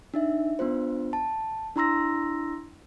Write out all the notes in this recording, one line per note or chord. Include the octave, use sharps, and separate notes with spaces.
D4 D#4 E5
B3 D4 F4 C5
A5
D4 E4 A#5 C6 E6 A#6